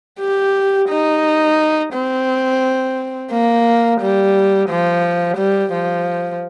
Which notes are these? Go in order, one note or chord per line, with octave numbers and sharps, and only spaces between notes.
G4
D#4
C4
A#3
G3
F3
G3
F3